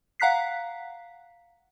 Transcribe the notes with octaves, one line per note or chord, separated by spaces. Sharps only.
F5 F#5 A#5 F#6 B6 C7